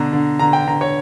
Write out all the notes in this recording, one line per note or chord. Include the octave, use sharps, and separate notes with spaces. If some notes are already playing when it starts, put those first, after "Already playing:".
Already playing: B2 D3 A#5
D3
D3 A#5
G5
D3 A#5
C#5